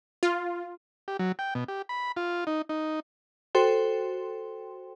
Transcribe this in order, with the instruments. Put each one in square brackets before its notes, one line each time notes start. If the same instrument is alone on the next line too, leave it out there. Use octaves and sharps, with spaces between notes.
[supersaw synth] F4
[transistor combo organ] G4
F#3
G5
B2
G4
B5
F4
D#4
D#4
[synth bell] F#4 A4 C5 G5 C6